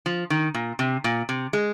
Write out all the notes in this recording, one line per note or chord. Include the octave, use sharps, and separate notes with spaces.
F3
D#3
A#2
C3
A#2
C3
G#3